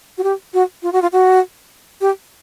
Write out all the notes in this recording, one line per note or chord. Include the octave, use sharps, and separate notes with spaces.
F#4
G4
F#4
F4
F#4
F4
F#4
G4